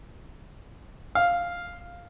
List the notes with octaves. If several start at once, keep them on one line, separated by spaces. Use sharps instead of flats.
F5